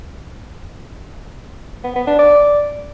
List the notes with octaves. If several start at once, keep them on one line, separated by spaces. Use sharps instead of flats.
B3
B3
D4
D5